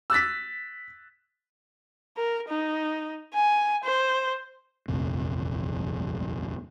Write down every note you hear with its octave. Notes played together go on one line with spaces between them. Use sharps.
E6 F#6 A6 B6
A#4
D#4
G#5
C5
D#1 A#1 F2 C3